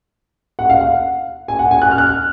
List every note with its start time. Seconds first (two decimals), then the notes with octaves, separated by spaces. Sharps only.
0.59 F#5
0.70 F5
0.81 F#5
1.48 G#5
1.59 F#5
1.71 G#5
1.82 F#6
1.91 F6
1.98 F#6